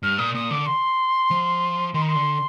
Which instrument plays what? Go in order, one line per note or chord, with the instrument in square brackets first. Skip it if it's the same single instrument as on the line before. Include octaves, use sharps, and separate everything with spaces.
[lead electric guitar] G2 [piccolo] F6
[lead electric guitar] A#2 [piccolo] D#6
[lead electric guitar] A#2 [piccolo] D#6
[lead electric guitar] D3 [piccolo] D6
[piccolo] C6
[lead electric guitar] F3
[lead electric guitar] D#3 [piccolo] C6
[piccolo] A#5
C6
[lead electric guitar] D3